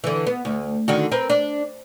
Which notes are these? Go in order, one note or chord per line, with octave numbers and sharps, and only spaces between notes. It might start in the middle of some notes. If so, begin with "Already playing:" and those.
D3 E3
B3
D2
D3 D#3 F#4
C4 A#4 B4
D4